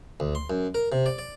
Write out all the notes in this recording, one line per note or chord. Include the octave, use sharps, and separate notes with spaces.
D2
C6
F#2
A#4
C3
D5
D5